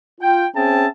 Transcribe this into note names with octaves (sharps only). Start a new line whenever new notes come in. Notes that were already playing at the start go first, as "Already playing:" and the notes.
F4 G5
C4 C#4 G#4 E5 G5 A5